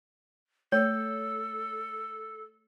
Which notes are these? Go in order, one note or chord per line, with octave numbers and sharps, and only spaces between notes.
A3 A4 C#5